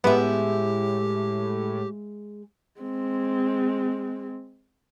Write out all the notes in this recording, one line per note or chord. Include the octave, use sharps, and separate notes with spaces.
A2 G#3 B3 G4 E5
G#3 C4